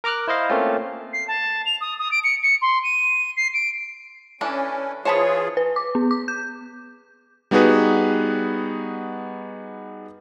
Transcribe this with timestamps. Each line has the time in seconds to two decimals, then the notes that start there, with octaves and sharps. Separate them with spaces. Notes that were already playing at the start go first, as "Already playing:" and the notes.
0.04 A#4 A#5 D6 F6 F#6
0.28 E4 C5 D#5 F5
0.49 A3 A#3 C4 C#4 F4
1.13 C7
1.28 A5
1.66 F7
1.81 D#6
1.99 D#6
2.11 D7
2.24 C#7
2.43 C#7
2.62 C6
2.83 D#7
3.37 C7
3.54 D7
4.41 E3 C#4 D4 A4
5.05 E3 F4 G#4 C5 C#5 A5 B5
5.57 B4
5.76 D6
5.95 B3
6.11 D6
6.28 G6
7.51 G3 B3 D#4 F#4 G#4 B4